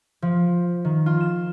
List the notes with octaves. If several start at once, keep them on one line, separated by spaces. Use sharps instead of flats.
F3
D#3
F4
E7